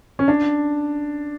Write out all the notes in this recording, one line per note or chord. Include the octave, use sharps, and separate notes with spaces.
C#4
D4